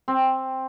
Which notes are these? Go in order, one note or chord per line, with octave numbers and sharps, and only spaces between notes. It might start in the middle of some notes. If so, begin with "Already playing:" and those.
C4